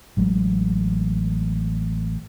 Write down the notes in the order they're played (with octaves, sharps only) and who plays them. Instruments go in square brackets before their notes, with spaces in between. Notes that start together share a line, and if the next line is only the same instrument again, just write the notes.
[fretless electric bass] A1 F#3 G#3